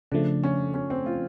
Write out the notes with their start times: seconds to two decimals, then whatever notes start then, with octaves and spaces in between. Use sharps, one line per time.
0.12 C#3 F3 A3 D4
0.44 C#4
0.74 C#4
0.90 C4
1.06 F4